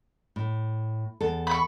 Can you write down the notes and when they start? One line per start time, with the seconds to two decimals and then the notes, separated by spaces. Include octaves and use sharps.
0.36 A2
1.21 E2 A4
1.47 B5 C#6